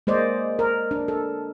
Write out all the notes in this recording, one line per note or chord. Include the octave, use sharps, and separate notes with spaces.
G#3 A#3 C5 D5 D#5
A#4
D4
A4